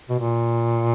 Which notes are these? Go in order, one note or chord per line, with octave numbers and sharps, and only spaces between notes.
B2
A#2